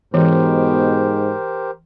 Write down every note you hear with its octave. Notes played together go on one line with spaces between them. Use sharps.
G#2 B2 E3 G4 A#4 C5